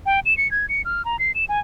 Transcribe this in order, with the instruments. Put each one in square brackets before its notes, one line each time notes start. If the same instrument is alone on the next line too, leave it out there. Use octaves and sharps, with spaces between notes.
[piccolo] G5
E7
C#7
G#6
C#7
F6
A#5
C7
E7
G#5